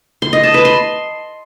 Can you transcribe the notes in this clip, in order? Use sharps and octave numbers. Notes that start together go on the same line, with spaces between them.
C6
D#5
A5
B4
C6